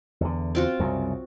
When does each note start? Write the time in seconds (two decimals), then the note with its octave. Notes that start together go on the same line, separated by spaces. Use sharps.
0.21 E2 D3
0.55 C4 F4 F#4
0.80 C2 F#2 C#3